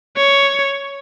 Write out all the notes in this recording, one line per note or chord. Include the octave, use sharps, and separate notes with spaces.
C#5